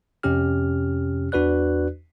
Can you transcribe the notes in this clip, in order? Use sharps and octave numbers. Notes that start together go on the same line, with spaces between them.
F2 C3 C#4 G4 F6
E2 D4 F#4 B4 D5 F#6